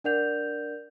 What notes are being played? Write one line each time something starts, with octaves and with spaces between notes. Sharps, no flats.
D4 A#4 D5 F#5 G6 F7